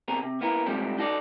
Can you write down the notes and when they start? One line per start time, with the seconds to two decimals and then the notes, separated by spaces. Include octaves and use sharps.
0.08 B2 C4 G#4 A#4
0.23 C3
0.41 A#3 B3 E4 A#4
0.66 G#2 C3 F3 G3 A3 C4
0.99 D#4 F#4 A4 D5